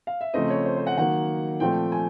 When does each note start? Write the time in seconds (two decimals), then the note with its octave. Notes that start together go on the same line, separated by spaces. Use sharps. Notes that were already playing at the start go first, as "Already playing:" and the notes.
0.07 F5
0.21 E5
0.34 C#3 F3 A3 C4 D#5
0.50 C#5
0.66 C5
0.77 C5
0.87 F#5
0.98 D#3 F#3 A#3 F#5
1.60 A#2 F3 A3 C4 G5
1.92 G#5